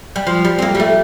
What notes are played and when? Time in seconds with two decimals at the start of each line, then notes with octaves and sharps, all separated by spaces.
0.16 G3
0.27 F3
0.45 G3
0.59 C4
0.62 A#3
0.75 G3
0.80 A3